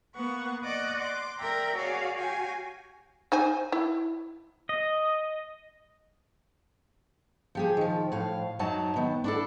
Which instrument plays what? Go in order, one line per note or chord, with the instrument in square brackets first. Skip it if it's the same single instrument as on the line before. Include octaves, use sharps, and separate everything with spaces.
[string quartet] A#3 B3 F#5 C#6
D5 D#5 F#5 C#6 D6
C6 D6
A#4 D5 E5 G5 A#5
F#4 G#4 C#5 D5 F5
F#4 G4 F5 G#5
[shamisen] D#4 C5 G#5
E4
[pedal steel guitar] D#5
[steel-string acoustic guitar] F3 G4 G#4
D#3 F3
A2 F3 F5
F#2 F#3 D#4 A5
D#3 B3
D4 E4 A4